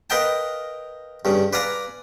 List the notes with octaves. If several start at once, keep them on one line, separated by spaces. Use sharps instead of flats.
A#4 B4 D#5 F5 G5 A5
G2 C#3
B4 D5 F5 G#5 A#5